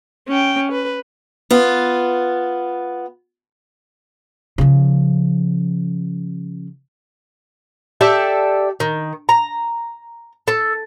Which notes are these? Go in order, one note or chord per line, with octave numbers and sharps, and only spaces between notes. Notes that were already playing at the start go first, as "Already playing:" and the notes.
C#4 G5
B4
B3 F4
C#3 F3
G4 A4 D5 E5
D#3
A#5
A4